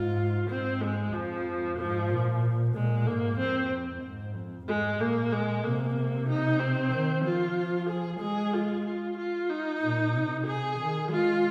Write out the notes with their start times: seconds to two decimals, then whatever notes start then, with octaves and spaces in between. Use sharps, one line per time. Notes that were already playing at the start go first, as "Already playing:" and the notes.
Already playing: G#2 F4
0.49 G#2 C4
0.82 G#3
1.13 F2 F3
1.78 G#2 F3
2.10 A#2
2.74 A#2 G#3
3.06 G#2 A#3
3.39 F2 C4
4.03 G#2
4.35 F2
4.67 G#2 G#3
5.00 A#2 A#3
5.32 G#3
5.64 C3 A#3
5.96 C3
6.28 D#4
6.60 C4
6.92 D#3
7.24 F3 F4
7.89 G#4
8.21 G#3 G#4
8.54 F4
8.86 F4
9.17 F4
9.49 D#4
9.82 A#2
10.14 C3
10.46 G#4
10.78 D#3
11.10 G#3 F4